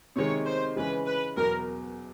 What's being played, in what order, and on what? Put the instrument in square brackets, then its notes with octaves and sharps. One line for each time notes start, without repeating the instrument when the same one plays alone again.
[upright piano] C3 D#3 G#3 [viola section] C#5
[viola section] C5
[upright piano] C#3 E3 G#3 C#4 [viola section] B4
[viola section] B4
[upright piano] E2 B2 F#3 [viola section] A#4